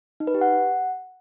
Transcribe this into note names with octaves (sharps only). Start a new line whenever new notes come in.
D#4
B4
G4
F#5